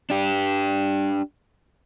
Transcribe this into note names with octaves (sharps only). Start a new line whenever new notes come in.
D4 G4